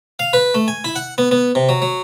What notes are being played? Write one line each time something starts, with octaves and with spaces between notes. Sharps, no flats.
F5
B4
A3
G#5
E4
F#5
B3
B3
C3
F#3
F#3